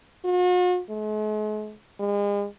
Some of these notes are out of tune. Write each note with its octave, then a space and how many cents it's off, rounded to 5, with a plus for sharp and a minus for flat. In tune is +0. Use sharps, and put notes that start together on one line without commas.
F#4 -45
G#3 +45
G#3 -40